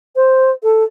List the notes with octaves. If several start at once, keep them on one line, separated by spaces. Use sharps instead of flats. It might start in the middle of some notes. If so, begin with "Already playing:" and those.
C5
A4